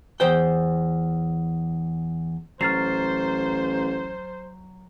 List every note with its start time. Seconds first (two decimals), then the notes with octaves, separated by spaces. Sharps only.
0.20 E2 C5 G5
2.61 A1 F#3 C5 F6 A6 C7